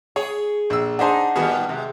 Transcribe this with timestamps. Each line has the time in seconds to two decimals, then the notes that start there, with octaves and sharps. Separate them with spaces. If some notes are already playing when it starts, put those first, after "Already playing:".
0.16 G#4 C#5
0.70 A#1 E6
0.99 D4 D#4 G#4 C5 F#5 A5
1.36 A2 D#3 G3 B3 F#4 G#4
1.69 C3 G#3